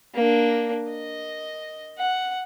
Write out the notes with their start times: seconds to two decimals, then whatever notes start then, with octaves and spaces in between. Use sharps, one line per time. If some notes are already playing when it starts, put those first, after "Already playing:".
0.15 A#3 D4
0.91 D#5
1.98 F#5